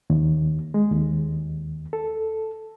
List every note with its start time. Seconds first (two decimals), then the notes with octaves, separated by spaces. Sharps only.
0.10 D#2
0.74 G#3
0.91 D#2
1.93 A4